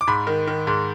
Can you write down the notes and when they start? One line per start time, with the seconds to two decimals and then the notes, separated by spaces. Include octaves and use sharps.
0.01 D6
0.07 G#2 B5
0.27 D#3
0.47 D#3
0.67 G#2